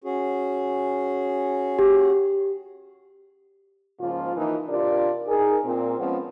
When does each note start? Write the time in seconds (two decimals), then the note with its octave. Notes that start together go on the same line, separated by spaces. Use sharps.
0.04 C#4 F#4 G#4
1.79 G4
4.00 G#2 C#3 F3 A#3 F4
4.35 E3 F3 A#3 D#4
4.68 C3 D4 F4 G4 A#4 D5
5.27 D#4 G#4 A#4
5.64 A#2 C4
5.98 F3 G#3 B3 C#4